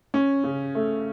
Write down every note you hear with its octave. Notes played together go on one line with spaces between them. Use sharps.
C#4
C#3
A3